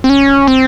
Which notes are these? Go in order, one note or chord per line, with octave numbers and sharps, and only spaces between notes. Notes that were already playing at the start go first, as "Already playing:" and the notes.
C4
C#4
C4